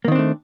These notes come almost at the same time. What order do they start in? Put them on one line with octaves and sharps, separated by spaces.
A#3 D#3 C4 D4 A3